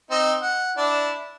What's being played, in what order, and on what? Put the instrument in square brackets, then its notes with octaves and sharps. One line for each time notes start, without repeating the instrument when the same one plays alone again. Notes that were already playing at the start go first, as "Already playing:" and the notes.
[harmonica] C4 D#4
F#5
D4 E4